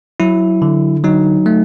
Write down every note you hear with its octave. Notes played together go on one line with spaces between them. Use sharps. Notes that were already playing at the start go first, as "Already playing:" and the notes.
F#3 E4
D3
F#3 D#4
A3